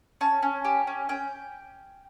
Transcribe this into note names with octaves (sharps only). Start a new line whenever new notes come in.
C#4 A5
C#4
G4
C#4
C#4 G5